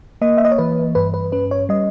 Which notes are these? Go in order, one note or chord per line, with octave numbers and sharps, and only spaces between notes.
A#3 D#5
E5
D#5
C#5
E3 B4
G2 B4
B4
C#4 B4
C#5
G3 D#5